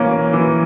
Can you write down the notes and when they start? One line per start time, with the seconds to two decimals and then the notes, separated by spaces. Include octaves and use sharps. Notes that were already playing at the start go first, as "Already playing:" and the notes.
Already playing: E3 A#3 C#4
0.33 E3